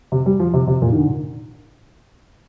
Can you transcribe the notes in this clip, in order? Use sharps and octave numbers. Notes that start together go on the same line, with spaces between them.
C3
G3
F3
C3
C3
A#2
D#3
D3